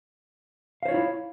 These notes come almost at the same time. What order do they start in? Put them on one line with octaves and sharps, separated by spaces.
F5 C5 C#5 F4 E4